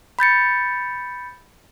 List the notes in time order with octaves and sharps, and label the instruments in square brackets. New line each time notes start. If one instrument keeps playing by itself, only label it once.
[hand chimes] B5 G6 A6 C#7